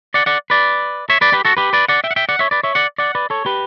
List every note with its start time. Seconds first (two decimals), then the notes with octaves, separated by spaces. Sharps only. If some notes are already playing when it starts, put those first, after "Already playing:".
0.14 D5 F#5
0.26 D5 F#5
0.50 B4 D5
1.10 C#5 E5
1.21 B4 D5
1.33 G4 B4
1.45 F#4 A4
1.57 G4 B4
1.73 B4 D5
1.88 D5 F#5
2.04 E5 G5
2.11 F#5
2.16 E5 G5
2.29 D5 F#5
2.39 C#5 E5
2.51 B4 D5
2.63 C#5 E5
2.75 D5 F#5
2.98 D5 F#5
3.15 B4 D5
3.30 A4 C#5
3.46 G4 B4